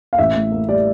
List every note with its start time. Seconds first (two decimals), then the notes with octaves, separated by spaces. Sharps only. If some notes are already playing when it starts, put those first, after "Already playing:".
0.13 F5
0.18 A1 E5
0.35 A2
0.52 A#3
0.68 G3 D5